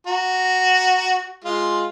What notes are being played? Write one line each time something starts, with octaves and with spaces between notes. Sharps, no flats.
F#4 A#5
G#3 F4